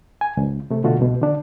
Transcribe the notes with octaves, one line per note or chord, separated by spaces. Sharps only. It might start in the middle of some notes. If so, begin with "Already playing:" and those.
G#5
C#2
C3 A3
B2 D3 A3 F4 F#4
C2 B2
D3 D4